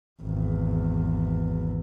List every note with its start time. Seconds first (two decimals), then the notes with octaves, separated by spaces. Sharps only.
0.22 G#1 E2